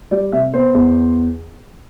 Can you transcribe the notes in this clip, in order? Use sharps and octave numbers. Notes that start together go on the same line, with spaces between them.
G3 D5
C3 E5
B3 C5
E2